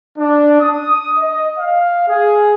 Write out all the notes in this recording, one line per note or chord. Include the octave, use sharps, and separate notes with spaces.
D4
D#6
D#5
F5
G#4